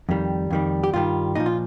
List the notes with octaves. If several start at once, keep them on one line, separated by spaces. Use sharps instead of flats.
F2 D#3 G3
F2 D#3 G3
G4
G2 D#3 G3 F4
A#2 F3 D#4
F4